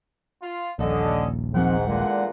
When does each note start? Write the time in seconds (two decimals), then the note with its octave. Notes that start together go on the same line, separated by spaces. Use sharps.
0.41 F4
0.79 D#1 A#1 D3 C#4 A4 D#5 F5
1.54 G#2 D#3 F3 C4 F#5
1.87 E2 A#2 D3 G#3